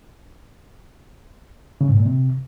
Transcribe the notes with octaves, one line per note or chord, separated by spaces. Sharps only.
C#3
G#2
A#2
C3